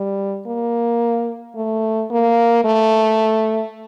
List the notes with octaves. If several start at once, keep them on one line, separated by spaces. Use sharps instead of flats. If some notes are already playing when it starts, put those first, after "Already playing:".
Already playing: G3
A#3
A3
A#3
A3